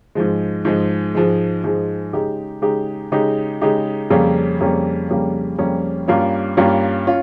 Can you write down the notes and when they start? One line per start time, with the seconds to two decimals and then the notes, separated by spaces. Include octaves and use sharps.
0.15 G#2 F3 G#3
0.65 G#2 F3 G#3
1.15 G#2 F3 G#3
1.64 G#2 F3 G#3
2.13 C#3 G#3 D#4 G4
2.62 C#3 G#3 D#4 G4
3.12 C#3 G#3 D#4 G4
3.61 C#3 G#3 D#4 G4
4.10 F2 C#3 G3 A#3 C#4
4.60 F2 C#3 G3 A#3 C#4
5.10 F2 C#3 G3 A#3 C#4
5.58 F2 C#3 G3 A#3 C#4
6.08 G2 G3 A#3 C#4 F4
6.57 G2 G3 A#3 C#4 F4
7.07 C#4 F4